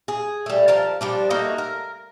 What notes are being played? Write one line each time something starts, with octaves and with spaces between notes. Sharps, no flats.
G#4
G3 A3
F3 A#4 A5
F3 G3 D4
A3 A#3 D#4 F#4
A#4